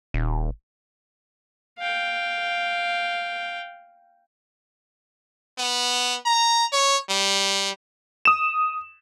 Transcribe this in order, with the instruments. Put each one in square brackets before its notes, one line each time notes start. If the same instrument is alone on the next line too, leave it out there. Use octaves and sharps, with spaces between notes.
[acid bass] D#1
[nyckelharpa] F5 G5
[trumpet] B3
A#5
C#5
G3
[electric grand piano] D#6 E7